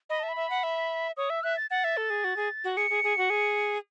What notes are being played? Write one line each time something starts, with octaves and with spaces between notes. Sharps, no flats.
D#5 B5
E5 A5
B5
E5
F#5
E5
C#5 D#6
E5 E6
E5 F#6
A6
F#5 A6
E5
A4
G#4
F#4
G#4
F#4
G#4 C#7
G#4
G#4
F#4
G#4